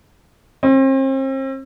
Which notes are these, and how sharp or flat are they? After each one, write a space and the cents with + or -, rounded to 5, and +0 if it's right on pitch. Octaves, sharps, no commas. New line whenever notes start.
C4 +40